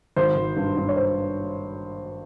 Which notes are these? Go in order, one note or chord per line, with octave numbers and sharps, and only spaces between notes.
G#1 C5
G#1
G2
G2
C#5
C5